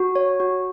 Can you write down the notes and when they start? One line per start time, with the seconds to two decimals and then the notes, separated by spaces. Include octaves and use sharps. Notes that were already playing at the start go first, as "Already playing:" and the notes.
Already playing: F#4
0.16 C#5
0.40 F#4